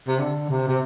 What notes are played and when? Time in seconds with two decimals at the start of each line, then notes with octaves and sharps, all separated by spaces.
0.08 C3
0.19 D3
0.49 C3
0.68 C3